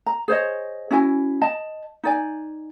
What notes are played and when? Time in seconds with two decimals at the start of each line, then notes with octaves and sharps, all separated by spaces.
0.06 A#5
0.28 G#4 C5 C#5 D#5
0.91 C#4 E4 F#4 G#5
1.41 D#5 A5
2.04 D#4 D5 G#5